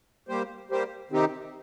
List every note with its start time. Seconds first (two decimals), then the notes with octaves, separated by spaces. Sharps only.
0.28 G3 A#3 G4 C5
0.70 G3 A#3 G4 C5
1.11 C3 D#3 C4 D#4 G4